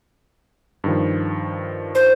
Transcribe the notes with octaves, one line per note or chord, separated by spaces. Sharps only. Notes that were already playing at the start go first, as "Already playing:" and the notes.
G2 D#3 F3
C5